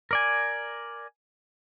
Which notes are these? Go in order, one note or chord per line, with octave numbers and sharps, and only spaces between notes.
A#4 D5 G#5